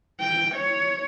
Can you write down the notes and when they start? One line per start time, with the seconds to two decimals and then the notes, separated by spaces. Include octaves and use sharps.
0.20 G5
0.55 C#5